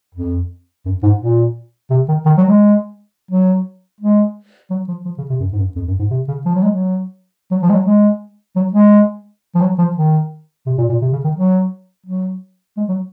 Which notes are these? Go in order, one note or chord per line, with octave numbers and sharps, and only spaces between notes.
F2
F#2
G#2
A#2
C3
D#3
D#3
F#3
G#3
F#3
G#3
F#3
F3
F3
C#3
C3
F#2
G#2
F#2
F2
F#2
G#2
C3
C#3
F3
F#3
G#3
F#3
F#3
F3
G#3
F#3
G#3
F#3
G#3
F3
F#3
F3
D#3
C3
A#2
A#2
C3
C#3
D#3
F#3
F#3
G#3
F#3